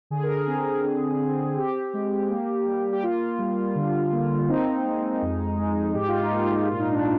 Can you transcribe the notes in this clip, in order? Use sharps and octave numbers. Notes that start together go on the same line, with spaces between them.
D3 G#4
A#4
G#4
C4
D3
C4
C4 G4
G#3
A#3
G3
G4
A#3 F4
G3
D3
A#3
C4 D#4
G#3
F2
G#3
G#2 G4
F4
D#4
A#3
F4
A#2 F4
D#4
D4